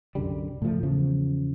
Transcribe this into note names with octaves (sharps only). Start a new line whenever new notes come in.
C2 F#2 D3 G3
A2 C#3 F3 A3
E2 C#3 F3